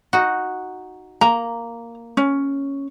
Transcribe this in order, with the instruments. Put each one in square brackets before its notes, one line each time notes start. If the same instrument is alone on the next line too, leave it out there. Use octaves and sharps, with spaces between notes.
[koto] D#4 F#4
[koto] A#3 [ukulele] A#5
[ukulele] C#4